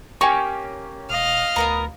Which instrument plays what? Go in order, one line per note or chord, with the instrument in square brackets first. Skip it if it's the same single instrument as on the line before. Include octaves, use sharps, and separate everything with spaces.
[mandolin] A#3 C#4 G4 [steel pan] G#5 C#6
[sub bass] E1 [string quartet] D#5 F5 F6
[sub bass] D2 [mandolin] B3 A#4 A#5